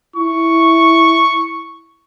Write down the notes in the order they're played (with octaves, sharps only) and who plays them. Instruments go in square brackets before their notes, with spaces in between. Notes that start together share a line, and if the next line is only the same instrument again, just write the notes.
[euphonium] E4 [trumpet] C#6